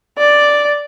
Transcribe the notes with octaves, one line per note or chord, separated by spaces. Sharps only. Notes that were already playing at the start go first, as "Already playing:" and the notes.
D5